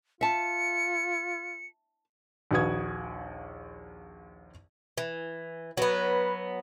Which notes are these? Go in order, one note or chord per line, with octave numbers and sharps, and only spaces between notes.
F4 E5 A5 C#7
A#1 D#2 F#4 B4 D#6 G#6
E3
F#3 B3 B4